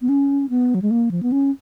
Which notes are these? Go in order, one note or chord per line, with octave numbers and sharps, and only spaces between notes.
B3
C#4
B3
F#3
G#3
A#3
F3
B3
C#4